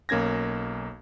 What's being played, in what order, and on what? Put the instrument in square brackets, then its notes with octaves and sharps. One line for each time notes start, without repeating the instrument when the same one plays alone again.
[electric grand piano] B1 A#3 C#4 G#6 A#6